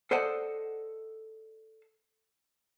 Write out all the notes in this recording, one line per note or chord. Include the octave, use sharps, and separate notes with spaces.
A4 C5 D5 D#5 F#5